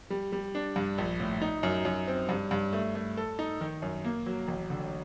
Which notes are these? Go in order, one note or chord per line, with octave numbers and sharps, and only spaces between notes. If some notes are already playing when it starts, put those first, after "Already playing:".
G3
G3
D4
G2
A#1
A2
D#4
F#2
F#2
C4
G2
G2
A3
A3
A4
D#4
D#3
F#2
A#3
F#3
A1
D3